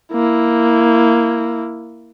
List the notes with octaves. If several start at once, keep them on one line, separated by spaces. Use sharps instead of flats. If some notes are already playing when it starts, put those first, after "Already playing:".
A#3 E4